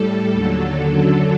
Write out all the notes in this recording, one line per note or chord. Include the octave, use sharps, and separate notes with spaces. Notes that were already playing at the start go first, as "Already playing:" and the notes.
Already playing: A2 G3 A4
D#2 D3 F#3 A4
F#2 D3 F#3 A4